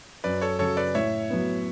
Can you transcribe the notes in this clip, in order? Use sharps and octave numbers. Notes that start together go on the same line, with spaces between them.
F#2 B4 D5
A4 C#5
C#3 F#3 A4 C#5
B4 D5
A2 C#5 E5
F#3 B3